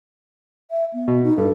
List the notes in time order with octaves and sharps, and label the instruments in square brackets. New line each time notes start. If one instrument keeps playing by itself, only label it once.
[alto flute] E5
B3
[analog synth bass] B2
[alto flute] D#4
[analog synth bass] G2 [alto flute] A4